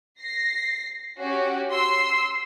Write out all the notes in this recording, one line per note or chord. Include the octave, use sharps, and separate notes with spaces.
A#6 C7
C#4 F#4 G4
C6 E6 C7